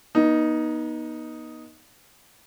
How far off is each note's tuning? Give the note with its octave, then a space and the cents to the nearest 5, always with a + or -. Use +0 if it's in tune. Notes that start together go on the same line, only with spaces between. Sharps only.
B3 -40 D#4 +0